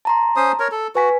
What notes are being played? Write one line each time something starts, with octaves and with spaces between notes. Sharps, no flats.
A5 A#5 C6
C#4 C5 D#6
A#4 C#5
A4
F#4 B4 G#5 B6